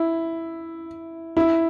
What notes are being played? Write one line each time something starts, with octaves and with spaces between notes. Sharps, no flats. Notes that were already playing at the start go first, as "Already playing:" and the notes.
Already playing: E4
E4